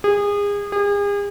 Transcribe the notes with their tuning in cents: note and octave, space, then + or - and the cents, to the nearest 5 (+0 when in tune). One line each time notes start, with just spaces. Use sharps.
G#4 -30
G#4 -40